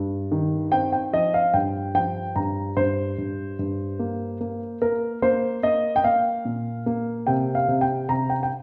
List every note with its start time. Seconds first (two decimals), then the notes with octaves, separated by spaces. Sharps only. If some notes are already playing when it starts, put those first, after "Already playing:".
Already playing: G2
0.32 D#3
0.72 C4 G5
0.92 G5
1.13 F3 D#5
1.34 F5
1.54 G2 G5
1.95 F3 G5
2.36 G2 A#5
2.76 G2 C5
3.18 G2
3.59 G2
3.99 A#3
4.41 A#3
4.82 A#3 A#4
5.22 A#3 C5
5.63 A#3 D#5
5.96 G5
6.04 A#3 F5
6.45 A#2
6.86 A#3
7.27 C3 G5
7.55 F5
7.68 C3
7.81 G5
8.09 C3 A#5
8.30 G5
8.43 G5